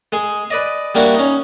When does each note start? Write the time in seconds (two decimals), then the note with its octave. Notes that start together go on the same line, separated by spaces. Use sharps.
0.12 G#3 G#4
0.50 B4 D5 D#5
0.95 G3 A#3 D4 E4 F#4
1.15 C#4 D#4